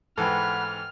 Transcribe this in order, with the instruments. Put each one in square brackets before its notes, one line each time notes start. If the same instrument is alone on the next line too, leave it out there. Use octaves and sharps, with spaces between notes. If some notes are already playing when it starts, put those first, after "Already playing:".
[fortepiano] G#2 E3 [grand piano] A4 G5 [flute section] F#5 B5 F#6 [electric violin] F6